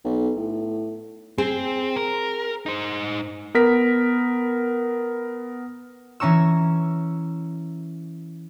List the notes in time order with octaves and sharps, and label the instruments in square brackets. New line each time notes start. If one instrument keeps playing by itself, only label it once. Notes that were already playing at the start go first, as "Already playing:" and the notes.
[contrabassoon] B1
A2
[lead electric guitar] C4 [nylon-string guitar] G#4
[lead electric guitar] A#4
D#4 C5
[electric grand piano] B3 A#4 B6
[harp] E3 C#4 A#5 C#6 E6